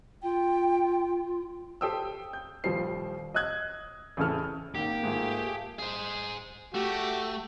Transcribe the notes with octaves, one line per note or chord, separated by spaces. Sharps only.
F4 G5
G4 A4 C5 G5 D#6 E6
G6
D#1 F3 G3 C5 C7
D#5 D#6 E6 F#6 G#6
A1 E2 C#3 E4 A4 F6
G#1 A#3 G4
G#2 A3 F4 G#4
G#4 C5
A3 F#4 G4